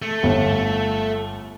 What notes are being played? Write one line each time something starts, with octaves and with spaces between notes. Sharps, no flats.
A3
G1